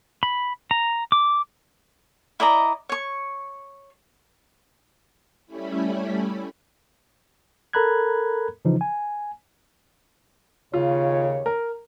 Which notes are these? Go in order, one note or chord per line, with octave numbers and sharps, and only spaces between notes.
B5
A#5
D6
E4 D5 D#5 A#5
C#5 C#6
G3 A3 C#4 E4 B5
A4 A#4 A#5 B5 F#6 G#6
C#3 E3 F3 D#4
G#5
D#2 C#3 F4 C#5
A#4